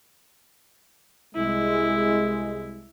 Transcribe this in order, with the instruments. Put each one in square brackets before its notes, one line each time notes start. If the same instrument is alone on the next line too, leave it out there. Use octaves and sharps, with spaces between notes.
[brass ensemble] C2 G#3 [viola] E4